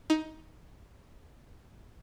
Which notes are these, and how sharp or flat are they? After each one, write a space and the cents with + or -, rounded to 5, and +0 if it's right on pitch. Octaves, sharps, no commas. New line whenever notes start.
D#4 +15